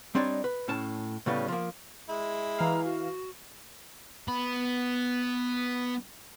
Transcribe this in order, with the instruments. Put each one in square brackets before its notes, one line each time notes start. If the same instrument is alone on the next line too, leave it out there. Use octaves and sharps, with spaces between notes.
[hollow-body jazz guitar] G3 C4 D4 D#4 C#5 D5
B4
A2 C#4 A5
A2 C#3 G3 B3
F3 A#3
[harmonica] G#3 E4
[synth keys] E3 F5 [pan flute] A#5
[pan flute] F#4
[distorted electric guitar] B3 B5